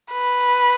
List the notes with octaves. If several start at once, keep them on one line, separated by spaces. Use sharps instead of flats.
B4